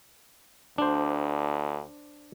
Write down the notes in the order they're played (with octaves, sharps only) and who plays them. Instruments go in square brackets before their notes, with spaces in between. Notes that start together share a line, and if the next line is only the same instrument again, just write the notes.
[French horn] D2 [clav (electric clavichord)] D4 C5